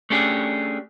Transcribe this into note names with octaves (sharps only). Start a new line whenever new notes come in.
A3 C#4 D4 G4 G#4